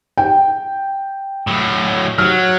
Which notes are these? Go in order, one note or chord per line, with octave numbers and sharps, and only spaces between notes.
G5
A2 F#3
F#3 F6